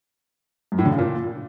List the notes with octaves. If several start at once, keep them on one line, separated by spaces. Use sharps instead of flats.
F#2
A2
D3
C#3
A#2